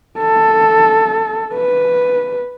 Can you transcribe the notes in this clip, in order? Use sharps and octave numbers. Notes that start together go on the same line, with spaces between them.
A4
B4